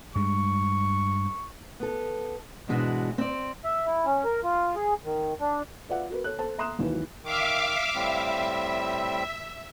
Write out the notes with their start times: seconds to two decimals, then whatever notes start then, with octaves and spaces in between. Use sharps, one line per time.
0.16 G2 G#3 C#6
1.80 B3 A4
2.68 G#2 B2 E3 G#3 D4 F#4
3.18 C4 D5
3.64 E5
3.87 E4
4.06 C#4
4.25 A#4
4.44 F4
4.76 G#4
5.04 D#3
5.41 D4
5.89 F4 B4 D5 E5 F#5
6.10 F#4 A#4 B4
6.24 A4 C#5 F#6
6.39 A4 C5 A5
6.58 E5 A#5 C6 D#6 F#6 E7
6.79 G#1 D#2 E3 F#3 B4
7.24 D#3 E5 F5 D6
7.95 A2 G3 C4 E5